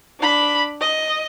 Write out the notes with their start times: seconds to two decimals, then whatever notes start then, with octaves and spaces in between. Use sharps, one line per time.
0.20 D4 B5
0.81 D#5